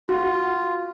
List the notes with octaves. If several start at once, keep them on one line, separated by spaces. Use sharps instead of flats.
F4 F#4